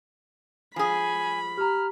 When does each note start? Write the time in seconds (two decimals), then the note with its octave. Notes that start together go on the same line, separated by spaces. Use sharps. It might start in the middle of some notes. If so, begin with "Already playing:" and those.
0.76 F3 G#4 G#5 B5
1.57 G4 A#5 F6